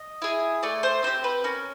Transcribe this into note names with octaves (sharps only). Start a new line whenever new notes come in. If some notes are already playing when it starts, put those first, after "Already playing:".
Already playing: D#5
E4 G#4
A3 D5
C5
C4 E4 G4 C5
B4
C#4 A#4